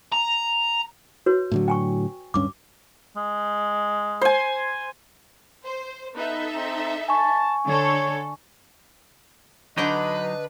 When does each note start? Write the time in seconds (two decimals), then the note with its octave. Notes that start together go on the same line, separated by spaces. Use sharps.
0.12 A#5
1.26 F#4 B4 C#5
1.52 A2 D3 F#3
1.68 G5 G#5 C#6
2.34 D1 G2 C#4 D6
3.16 G#3
4.21 C5 G#5
5.64 C5
6.15 B3 D#4 A4 B4 E5
6.53 C4 A#5
7.08 G#5 A5 C#6
7.67 D3 A4 C#5
9.78 D3 F#3 D4 D#4 B4 D#5 G5